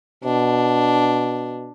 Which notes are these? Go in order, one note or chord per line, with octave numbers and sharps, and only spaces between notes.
B2 D4